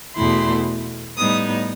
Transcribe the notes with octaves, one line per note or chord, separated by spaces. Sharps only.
E2 B2 A3 E4 C6
A2 G3 B3 D#4 D#6